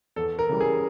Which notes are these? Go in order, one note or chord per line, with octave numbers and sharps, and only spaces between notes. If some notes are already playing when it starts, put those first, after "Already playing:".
E2 A4
A#4
C#3 E3 G3
G#4